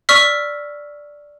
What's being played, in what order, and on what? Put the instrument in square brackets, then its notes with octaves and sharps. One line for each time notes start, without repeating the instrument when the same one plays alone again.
[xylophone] D5 C#6 E6 F6 B6